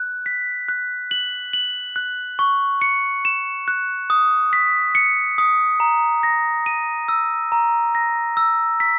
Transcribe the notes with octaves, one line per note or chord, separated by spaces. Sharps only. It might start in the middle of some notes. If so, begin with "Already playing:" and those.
Already playing: F#6
B6
F#6
F#7
F#7
F#6
C#6
C#7
E7
F#6
D#6
B6
C#7
D#6
A#5
A#6
D#7
E6
A#5
A#6
E6
B6